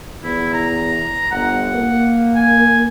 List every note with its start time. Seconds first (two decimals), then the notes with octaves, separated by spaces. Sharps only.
0.24 E2 E4
0.53 A#5
1.31 G1 F#5
1.74 A#3
2.36 G#5